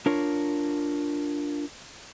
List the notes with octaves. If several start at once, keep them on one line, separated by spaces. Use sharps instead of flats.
D4 F4 A#4 C#5